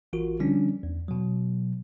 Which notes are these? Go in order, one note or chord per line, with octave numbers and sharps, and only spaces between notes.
A1 E3 F4 F#4 A#4
D3 F3 G3 C#4 D4
E2
B2 F#3